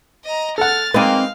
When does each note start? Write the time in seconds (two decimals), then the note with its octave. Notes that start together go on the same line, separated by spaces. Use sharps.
0.25 D#5 A#5
0.58 A4 F#5 F6 A6
0.94 G#3 A#3 C4 D#4 B4 F5